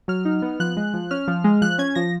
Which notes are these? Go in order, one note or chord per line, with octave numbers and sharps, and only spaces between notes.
F#3 F6
D#4
B3
F3 F#6
G#3
F3
C#4 F6
F3
G#3
F3 F#6
C#4 G#6
F3 A#6